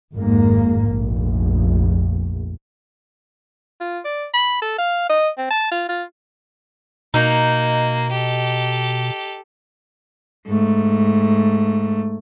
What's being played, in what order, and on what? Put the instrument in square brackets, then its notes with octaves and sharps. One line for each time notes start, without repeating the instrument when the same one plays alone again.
[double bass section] G#1 F2 G#2 A#3
F1 A#1
[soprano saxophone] F4
D5
B5
A4
F5
D#5
C4
A5
F4
F4
[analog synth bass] B2 [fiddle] A#3 [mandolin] D#4
[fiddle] G4 A4
[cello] G#2 A3